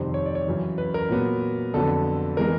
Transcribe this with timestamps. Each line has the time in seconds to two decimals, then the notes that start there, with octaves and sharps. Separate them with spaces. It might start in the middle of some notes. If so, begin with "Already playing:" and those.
Already playing: F2 C3 D#3 G3 C5
0.14 C#5
0.26 D5
0.35 C#5
0.47 F#2 C#3 E3
0.78 B4
0.94 A#4
1.09 A#2 F#3 B3
1.74 F2 D3 F#3 B3 A4
2.37 E3 G#3 B3 A#4